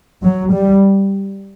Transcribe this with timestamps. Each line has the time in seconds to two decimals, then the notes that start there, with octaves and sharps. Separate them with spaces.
0.24 F#3
0.54 G3